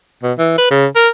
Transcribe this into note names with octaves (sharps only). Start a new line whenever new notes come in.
B2
E3
B4
C#3
A#4